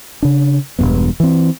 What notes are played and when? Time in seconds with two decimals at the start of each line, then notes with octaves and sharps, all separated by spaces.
0.22 C#3 D4
0.79 E1 E2 G2 B3
1.20 E3 C4